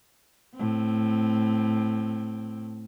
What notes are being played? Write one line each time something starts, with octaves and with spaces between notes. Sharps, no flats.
A2 C4